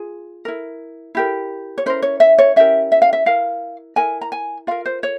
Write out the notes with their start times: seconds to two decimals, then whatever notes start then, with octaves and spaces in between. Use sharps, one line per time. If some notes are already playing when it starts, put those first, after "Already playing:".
Already playing: F4 G#4
0.45 E4 A#4
1.15 E4 G4 A#4
1.78 C#5
1.86 C#4 E4 A#4 C5
2.02 C#5
2.20 E5
2.38 C#5
2.56 C#4 E4 G4 A#4 E5
2.92 E5
3.02 F5
3.13 E5
3.26 E4 A#4 F5
3.96 E4 A#4 G#5
4.21 A#5
4.32 G#5
4.67 F4 A#4 F5
4.86 C5
5.03 C#5